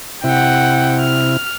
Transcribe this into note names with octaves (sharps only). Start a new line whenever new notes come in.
C3 E4 F#5 G5
F6